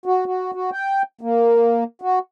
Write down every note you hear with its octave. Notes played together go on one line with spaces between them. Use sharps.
F#4
F#4
F#4
G5
A#3
F#4